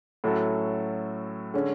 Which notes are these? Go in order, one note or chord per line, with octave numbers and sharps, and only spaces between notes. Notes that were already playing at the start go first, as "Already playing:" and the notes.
A2 F#3 C#4 F#4 A4
D3 G#3 C#4